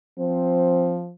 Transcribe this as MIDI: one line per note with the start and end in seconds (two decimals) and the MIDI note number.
0.19 1.13 53
0.19 1.01 60